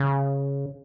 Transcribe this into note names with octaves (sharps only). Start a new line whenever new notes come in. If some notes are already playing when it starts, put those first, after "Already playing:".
Already playing: C#3